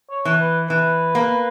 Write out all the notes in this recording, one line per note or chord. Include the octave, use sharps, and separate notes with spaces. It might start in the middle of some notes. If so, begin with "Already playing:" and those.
C#5
E3
B4
E3 B4
A#3